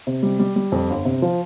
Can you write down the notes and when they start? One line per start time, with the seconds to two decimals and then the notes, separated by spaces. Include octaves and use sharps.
0.07 C3
0.23 G3
0.39 G3
0.56 G3
0.72 F2
0.90 G1
1.05 C3
1.22 F3